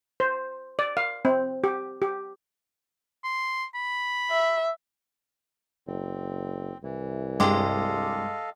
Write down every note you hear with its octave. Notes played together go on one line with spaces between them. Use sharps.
C5
D5
F5
C4
G4
G4
C6
B5
E5
F#1 C4
C2 E3
G2 G#3 A4 D#5 F5 G5 C6 D6